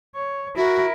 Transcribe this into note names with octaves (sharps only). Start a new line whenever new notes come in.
C#5
E4 F#4 A#4